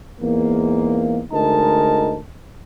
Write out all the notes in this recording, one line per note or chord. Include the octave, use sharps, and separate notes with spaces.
E2 G#2 A#3
D2 G#3 D#4 A#4 A5